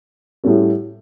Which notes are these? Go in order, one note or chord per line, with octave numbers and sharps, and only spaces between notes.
A2 G3 C#4 F#4 A4